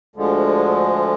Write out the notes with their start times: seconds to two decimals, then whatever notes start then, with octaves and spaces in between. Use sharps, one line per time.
0.16 D2 D3 F3 G#3